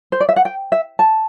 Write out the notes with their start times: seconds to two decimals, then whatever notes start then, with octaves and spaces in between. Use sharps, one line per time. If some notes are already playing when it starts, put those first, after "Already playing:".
0.12 C5
0.20 D5
0.29 E5
0.36 F#5
0.45 G5
0.72 E5
0.99 A5